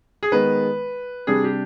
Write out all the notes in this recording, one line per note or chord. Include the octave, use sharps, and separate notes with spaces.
G#4
D#3 G#3 B3 B4
C3 G3 D4 G#4
G4